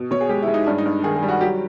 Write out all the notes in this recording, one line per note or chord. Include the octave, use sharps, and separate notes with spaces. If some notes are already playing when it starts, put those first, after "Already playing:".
Already playing: B2
B2 C#5
G#4
G#3 G4
E4
G#3
D#4
G2 D4
D#4
G2
D#3 G#4
G#4
G3
F#4
F#3 G4